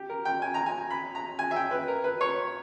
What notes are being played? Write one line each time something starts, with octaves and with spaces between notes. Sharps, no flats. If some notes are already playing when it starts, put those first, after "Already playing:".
Already playing: G4
A#4
G5
G#5
A#5
G#5
B5
A#5
G#5
E5
G5
B4
A#4
B4
C#5